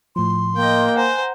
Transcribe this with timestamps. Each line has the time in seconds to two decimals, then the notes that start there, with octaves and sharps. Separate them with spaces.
0.16 A2 F3 C6
0.57 A#3 D#5 G5
0.96 C5 F#5 G#5 A#5